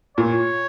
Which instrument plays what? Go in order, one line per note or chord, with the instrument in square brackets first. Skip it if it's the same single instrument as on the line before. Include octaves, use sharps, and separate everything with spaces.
[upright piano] A#2 [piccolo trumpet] C#5